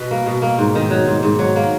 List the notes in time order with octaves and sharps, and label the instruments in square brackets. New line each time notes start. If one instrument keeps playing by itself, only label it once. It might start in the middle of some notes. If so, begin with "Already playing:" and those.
Already playing: [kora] B2 B4 D#5
A#3
B2
A#3
G#2
D#3
F#3
G#2
G#2
F#3
A#3